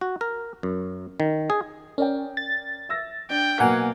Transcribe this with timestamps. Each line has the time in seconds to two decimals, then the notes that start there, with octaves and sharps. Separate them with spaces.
0.01 F#4
0.21 A#4
0.63 F#2
1.20 D#3
1.50 G#4
1.98 C#4 A#4 D5 G5
2.37 A6
2.89 E5 E6 A#6
3.30 D4 G5
3.60 B2 F#3 A#3 F#5 G#5